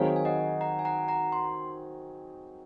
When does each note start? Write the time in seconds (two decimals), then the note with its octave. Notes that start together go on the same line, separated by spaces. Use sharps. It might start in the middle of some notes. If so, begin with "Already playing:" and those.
Already playing: D#3 F#3 C4 D#4 G#4 C#5 F5
0.16 G#5
0.25 D#5 F#5
0.61 F#5 A#5
0.79 G#5
0.85 F#5 A#5
1.08 F#5 A#5
1.32 C6